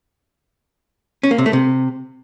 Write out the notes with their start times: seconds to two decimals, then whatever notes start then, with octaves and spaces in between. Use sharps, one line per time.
1.23 C#4
1.31 A#3
1.38 C3
1.46 A3
1.53 C3